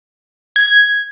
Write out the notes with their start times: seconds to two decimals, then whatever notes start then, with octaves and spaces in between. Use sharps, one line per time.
0.56 G#6